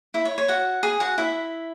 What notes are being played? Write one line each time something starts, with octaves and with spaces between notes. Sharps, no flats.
E4 E5
C#5
C#5
F#4 F#5
G#4 G#5
F#4 F#5
E4 E5